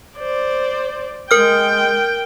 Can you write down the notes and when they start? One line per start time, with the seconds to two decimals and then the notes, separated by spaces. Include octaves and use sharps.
0.18 C5 D5
1.31 G#3 A#4 G5 F6